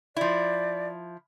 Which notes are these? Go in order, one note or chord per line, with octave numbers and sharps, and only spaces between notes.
F3 E4 D5